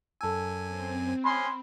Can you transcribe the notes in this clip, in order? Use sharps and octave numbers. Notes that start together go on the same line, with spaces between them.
F#2 A4 G#5 A5 E6
C4
G#3 C#4 B5 C6